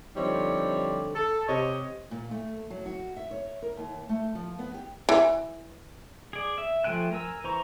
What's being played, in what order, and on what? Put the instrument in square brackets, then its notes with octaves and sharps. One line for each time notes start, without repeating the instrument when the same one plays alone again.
[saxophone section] D3 F3 G3 C4 D#4 C#5
A4
C3 C#5 D#5
[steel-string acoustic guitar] A#2
A3
F#3
F#4
E5
C#5
A#4
D#2
A3
F3
B3
G4
[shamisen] E3
[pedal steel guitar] G#4 D5
E5
F3 A3 G5 G#5 F#6
A#4 G#5 E6
E3 C5 A#5 C#6